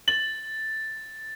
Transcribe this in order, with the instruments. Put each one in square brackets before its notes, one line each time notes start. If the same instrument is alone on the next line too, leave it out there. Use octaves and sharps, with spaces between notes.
[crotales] A6 [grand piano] F#7